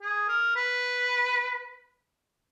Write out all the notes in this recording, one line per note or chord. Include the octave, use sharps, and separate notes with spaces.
G#4
A#4
B4